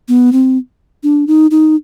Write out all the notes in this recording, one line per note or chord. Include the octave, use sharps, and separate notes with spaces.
B3
C4
D4
D#4
D#4